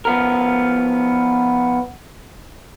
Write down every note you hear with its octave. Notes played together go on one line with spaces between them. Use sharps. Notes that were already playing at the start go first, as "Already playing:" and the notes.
F3 B3 A#4